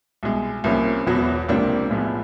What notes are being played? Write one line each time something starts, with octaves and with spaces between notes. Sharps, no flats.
C2 B2 G#3
C2 C3 F3 A#3 C#4
E1 E2 B2 F#3 B3
C#2 C3 F3 A#3 D4
B1 A2 F3 G#3 B3